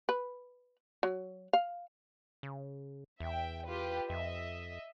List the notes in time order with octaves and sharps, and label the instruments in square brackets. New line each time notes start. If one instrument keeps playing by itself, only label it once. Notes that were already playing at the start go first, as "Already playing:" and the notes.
[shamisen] B4
F#3
F5
[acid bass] C#3
[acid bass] E2 [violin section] E5 G5
[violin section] F4 G4 B4
[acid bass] F2 [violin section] D#5 E5